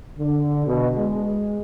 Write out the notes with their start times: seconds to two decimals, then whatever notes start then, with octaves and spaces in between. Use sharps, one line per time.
0.18 D3
0.67 B2
0.98 G#3